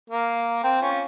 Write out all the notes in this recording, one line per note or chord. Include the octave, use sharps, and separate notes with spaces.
A#3
C4
C#4 F4